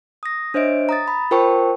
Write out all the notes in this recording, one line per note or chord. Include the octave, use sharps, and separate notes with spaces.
D#6 A#6
D4 C5 C#5 D#5 E5 D7
A#5 D#6 A6
B5
F4 A#4 C5 G5 A5 C#6